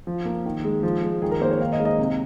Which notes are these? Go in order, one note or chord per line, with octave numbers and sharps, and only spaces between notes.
F3
A#3
D#3
G#3
F3
G#3
D#3 G#4
A#4
A#3 C5
C#5
D#3 F5
D#5
G#3
D#5
C3